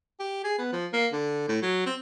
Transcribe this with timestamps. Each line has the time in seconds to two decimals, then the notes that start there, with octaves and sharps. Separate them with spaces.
0.20 G4
0.44 G#4
0.58 B3
0.73 F3
0.93 A#3
1.12 D3
1.49 A2
1.62 F#3
1.86 C4